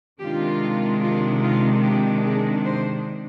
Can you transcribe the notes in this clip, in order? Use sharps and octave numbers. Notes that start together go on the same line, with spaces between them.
C3 D#3 G#3 D4 F4 G4
F4
F4
G4
G#4
C5